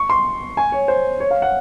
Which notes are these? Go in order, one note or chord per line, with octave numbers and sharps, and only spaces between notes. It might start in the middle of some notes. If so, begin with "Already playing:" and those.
Already playing: C#6
C6
G#5
C#5
C5
C#5
F5
F#5